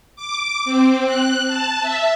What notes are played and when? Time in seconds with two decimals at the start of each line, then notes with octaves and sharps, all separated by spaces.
0.16 D6
0.65 C4
1.05 F#6
1.47 A5
1.81 E5